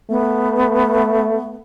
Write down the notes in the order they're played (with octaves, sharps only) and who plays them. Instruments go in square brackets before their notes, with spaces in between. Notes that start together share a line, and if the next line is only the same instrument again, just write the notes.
[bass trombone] A3 [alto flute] B3